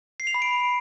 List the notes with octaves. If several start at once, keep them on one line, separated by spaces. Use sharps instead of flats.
C7
F7
B5
D7